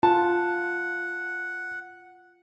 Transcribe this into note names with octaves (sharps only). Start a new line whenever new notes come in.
F4 F#5 A5